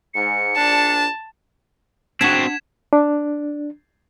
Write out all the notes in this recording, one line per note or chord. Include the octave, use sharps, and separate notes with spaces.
G#2 C#7
A#1 D4 A5
C4 D4 F#4 F#5 G#6 B6 E7
D4